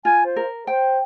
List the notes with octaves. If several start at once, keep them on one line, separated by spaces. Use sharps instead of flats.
F4 G#5
C5
A#4
C5 G5